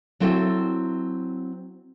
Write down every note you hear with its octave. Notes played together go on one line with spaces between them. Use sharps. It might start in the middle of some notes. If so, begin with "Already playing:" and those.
F#3 C4 E4 A4 C#5